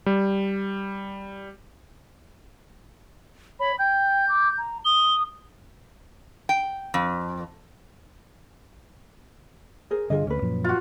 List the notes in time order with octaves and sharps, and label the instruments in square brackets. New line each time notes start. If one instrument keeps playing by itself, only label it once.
[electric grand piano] G3
[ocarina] C#5 [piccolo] B5
[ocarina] G5 [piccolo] G6
[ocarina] D6
A#5
[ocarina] D#6 [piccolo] G7
[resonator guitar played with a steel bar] G5
F2
[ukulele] G#4 A#4 C5
[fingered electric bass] G2 D3 [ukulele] F4 G#4 D#5
[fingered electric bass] D2 [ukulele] C#4 B4
[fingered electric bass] F#2 A#2 F3
[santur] F4 F#4